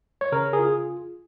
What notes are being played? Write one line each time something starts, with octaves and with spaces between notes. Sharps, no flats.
C#5
C#3 A#4
G#4
F4